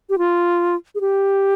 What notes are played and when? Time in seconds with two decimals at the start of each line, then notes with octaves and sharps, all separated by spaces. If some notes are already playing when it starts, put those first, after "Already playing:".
0.10 G4
0.18 F4
0.95 G#4
1.01 G4